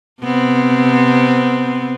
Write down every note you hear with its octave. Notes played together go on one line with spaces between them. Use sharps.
C3 B3 C4